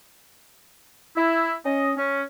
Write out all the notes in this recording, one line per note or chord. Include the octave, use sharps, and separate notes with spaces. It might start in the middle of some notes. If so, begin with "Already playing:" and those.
E4
C#4 D#5
C#4